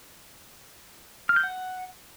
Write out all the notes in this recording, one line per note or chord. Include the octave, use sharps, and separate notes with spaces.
F6
G6
F#5